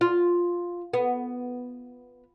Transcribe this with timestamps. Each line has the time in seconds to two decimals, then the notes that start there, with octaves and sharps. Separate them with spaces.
0.01 F4
0.93 B3